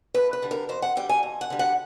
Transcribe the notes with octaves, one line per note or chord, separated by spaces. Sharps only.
F2 B4
B4
D3 G3
A#4
F2 C5
F#5
D3 G3 G5
G#5
F2
F#5
D3 G3
F#5